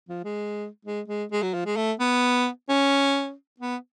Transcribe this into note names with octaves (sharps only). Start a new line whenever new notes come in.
F3
G#3
G#3
G#3
G#3
F#3
F3
G#3
A3
B3
C#4
B3